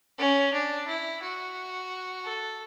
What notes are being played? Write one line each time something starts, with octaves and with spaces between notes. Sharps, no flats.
C#4
D4
E4
F#4
A4